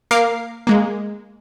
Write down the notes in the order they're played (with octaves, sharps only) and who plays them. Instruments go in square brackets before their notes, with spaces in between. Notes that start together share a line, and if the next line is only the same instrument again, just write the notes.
[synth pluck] A#3 A#4 F5 D6 C7
G#3 A#3